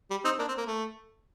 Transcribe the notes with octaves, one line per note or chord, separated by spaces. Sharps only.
G3
C4 D#4
A#3 D4
C4
A#3
A3